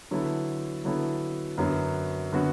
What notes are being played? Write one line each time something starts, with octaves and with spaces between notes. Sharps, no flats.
D3 F#3 B3 E4 A4
D3 F#3 B3 E4 A4
F#2 D3 F#3 B3 F#4
D3 F#3 B3 F#4